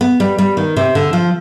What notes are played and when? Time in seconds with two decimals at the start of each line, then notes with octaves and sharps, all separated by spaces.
0.01 B3
0.20 G3
0.38 G3
0.57 D#3
0.76 C3
0.95 D3
1.13 F3